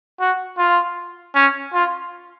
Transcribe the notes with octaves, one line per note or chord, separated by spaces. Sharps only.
F#4
F4
C#4
F4